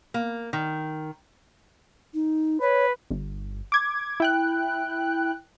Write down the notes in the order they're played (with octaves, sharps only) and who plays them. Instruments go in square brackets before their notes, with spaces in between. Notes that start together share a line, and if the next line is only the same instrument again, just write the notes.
[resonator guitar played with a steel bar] A#3
D#3
[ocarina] D#4
[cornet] B4 [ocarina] C#5
[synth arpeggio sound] G1
D6 G#6
E4 G5 F#6